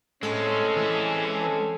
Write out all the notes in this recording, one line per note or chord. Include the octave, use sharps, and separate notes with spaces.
A2 G#3 C4 C#4 A4
E3